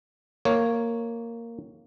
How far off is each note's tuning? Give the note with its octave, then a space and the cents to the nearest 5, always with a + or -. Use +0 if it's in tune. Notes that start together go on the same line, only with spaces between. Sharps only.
A#3 -10 C#5 +0